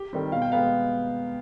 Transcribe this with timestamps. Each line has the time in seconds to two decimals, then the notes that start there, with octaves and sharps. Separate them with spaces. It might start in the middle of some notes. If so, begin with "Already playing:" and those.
Already playing: G4
0.13 D#3 G3 C4
0.32 B2 F5
0.42 G5
0.52 G#3 B3 F5